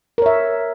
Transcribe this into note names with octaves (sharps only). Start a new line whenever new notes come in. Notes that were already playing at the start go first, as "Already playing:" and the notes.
A#4 C#5 E5